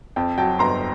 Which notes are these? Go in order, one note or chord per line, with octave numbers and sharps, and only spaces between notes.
F2 G5 A5
F#3 G5 A5
G1 A#5 C6